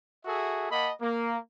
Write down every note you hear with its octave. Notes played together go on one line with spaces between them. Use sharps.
F#4 G#4 A4 E5
A#3 D#5 F#5 A5 B5
A#3